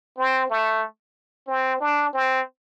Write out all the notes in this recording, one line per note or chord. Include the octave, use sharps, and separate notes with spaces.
C4
A3
C4
D4
C4